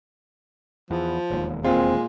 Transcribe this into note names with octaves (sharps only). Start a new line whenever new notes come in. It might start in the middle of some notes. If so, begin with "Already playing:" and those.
E2 F3
E1 D#2
A#2 G#3 C4 F4